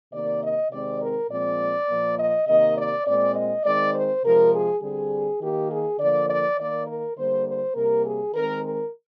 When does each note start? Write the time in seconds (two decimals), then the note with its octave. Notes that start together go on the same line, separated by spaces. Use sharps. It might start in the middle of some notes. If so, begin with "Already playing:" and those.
0.12 C3 D#3 A#3 D5
0.41 D#5
0.70 C3 D#3 G#3 C4 D5
1.00 A#4
1.29 A#2 F3 G#3 C4 D5
1.88 A#2 F3 A#3
2.18 D#5
2.47 C3 D#3 A#3 D#5
2.76 D5
3.06 A#2 G#3 C4 D5
3.35 D#5
3.64 D#3 G#3 C4 D5
3.94 C5
4.23 C3 F3 G#3 A#4
4.52 G#4
4.82 D3 G3 C4 G#4
5.40 D#3 A#3 G4
5.70 G#4
5.99 D3 F3 A#3 D5
6.29 D5
6.58 D#3 A#3 D5
6.87 A#4
7.16 D3 G3 A#3 C5
7.46 C5
7.75 C3 G3 A#3 A#4
8.04 G#4
8.34 D#3 G#3 C4 A#4
8.63 A#4